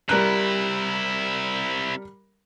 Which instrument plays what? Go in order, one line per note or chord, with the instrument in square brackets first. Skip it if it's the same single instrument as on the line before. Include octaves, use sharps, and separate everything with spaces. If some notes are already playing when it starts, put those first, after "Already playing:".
[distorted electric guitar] C3 E4 [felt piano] G3 A#4 F#6